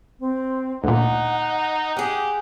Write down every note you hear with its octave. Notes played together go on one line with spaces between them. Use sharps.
C4
D2 A#2 D#4 F#5
G4 G#4 F#5